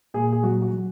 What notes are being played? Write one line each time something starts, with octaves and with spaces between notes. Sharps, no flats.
A#2 G#4
G#4
F#3 F#4
F#4
F#3